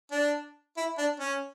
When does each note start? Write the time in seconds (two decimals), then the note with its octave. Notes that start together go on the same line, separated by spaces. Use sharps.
0.11 D4
0.77 E4
0.98 D4
1.20 C#4